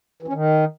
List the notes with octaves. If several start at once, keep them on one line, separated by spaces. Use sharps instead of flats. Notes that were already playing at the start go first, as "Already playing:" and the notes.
E3
C#4
D#3